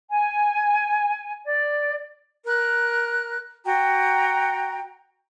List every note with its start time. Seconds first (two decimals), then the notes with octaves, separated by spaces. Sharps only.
0.09 G#5
1.45 D5
2.45 A#4 F#6
3.64 F#4 G5 A#5